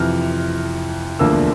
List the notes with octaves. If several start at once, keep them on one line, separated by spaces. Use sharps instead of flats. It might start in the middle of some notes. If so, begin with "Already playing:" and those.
Already playing: F2 C3 E3 F6
E1 D2 D3 F3 A#3 E6